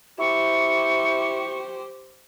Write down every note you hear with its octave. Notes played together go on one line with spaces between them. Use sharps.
E4 G4 C5 C#6